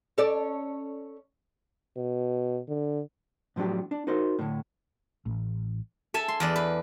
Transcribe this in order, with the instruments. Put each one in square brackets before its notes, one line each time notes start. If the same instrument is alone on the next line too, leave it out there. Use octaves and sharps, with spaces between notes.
[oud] C#4 A4 D5
[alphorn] B2
D3
[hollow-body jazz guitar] A2 F3 F#3 D4 G4
D4
D#4 F#4 A#4 C5
A2 D3
[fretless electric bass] A1
[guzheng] A4 E5 G#5
C6
E2 B4 D5
B4